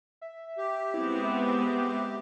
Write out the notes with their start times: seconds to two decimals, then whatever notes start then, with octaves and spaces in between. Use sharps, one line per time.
0.22 E5
0.58 G4
0.94 G#3 B3 C4 E4
1.23 E5